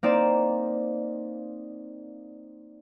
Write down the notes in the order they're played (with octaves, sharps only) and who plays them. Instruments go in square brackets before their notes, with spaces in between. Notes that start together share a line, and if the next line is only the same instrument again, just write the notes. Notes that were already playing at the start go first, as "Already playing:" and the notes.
[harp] A#3 C4 D#4 D5 E7